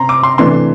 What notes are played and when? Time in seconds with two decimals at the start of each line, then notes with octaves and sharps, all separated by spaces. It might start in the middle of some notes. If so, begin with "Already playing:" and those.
Already playing: C3 A#5 C6
0.09 D6
0.23 C6
0.38 C3 E3 A3 D4 C6